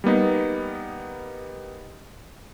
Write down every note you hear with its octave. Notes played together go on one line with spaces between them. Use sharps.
G3 A#3 B3 D#4